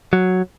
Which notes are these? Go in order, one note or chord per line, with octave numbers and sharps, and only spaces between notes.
F#3